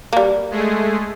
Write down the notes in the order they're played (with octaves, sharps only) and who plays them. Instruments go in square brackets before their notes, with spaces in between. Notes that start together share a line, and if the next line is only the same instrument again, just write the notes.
[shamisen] G3 A#3
[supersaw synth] G#3 A3 G#4